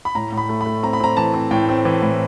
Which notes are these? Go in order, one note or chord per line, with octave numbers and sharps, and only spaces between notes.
B5
A2 A#5
A2
B5
A3
B5
A3
C4 A#5
B5
C4 A#5
E3 A5
C4
A2 G5
C4
E3
A2